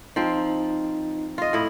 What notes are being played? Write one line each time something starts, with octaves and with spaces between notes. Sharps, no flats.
F3 C4 D#4
F4 D#5
A2 E4